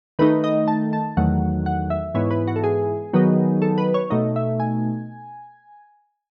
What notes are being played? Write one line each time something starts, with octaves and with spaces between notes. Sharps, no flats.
D#3 A3 D#4 B4
D#5
A5
A5
E2 D#3 F#3 A3 F#5
F#5
E5
G#2 E3 B3 E4 C#5
B4
F#4
A4
G#4
D#3 F#3 B3 D#4
A4
B4
C#5
B2 A3 D#4 D#5
E5
G#5